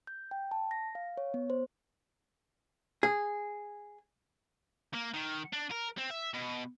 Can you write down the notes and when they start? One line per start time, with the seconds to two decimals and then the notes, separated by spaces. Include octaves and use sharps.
0.07 G6
0.31 G5
0.51 A5
0.71 A#6
0.95 F5
1.17 C#5
1.34 B3
1.50 C5
3.03 G#4
4.94 A#3
5.14 D#3
5.53 D4
5.71 A#4
5.98 C4
6.10 E5
6.34 B2